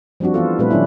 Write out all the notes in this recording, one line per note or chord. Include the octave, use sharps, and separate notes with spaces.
F3 G3 C4 D4 F#4
E3 B3 F4 A4
A#2 G3 A3 C4 A4 B4
D#3 F#3 C#4 D4 E4